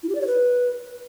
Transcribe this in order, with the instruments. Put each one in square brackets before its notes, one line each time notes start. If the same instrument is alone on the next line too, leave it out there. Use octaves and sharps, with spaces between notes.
[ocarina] E4
G4
D5
C#5
B4